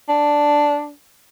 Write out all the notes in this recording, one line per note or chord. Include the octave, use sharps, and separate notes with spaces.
D4